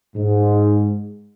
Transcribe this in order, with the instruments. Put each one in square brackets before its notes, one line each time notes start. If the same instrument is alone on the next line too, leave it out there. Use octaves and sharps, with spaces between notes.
[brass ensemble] G#2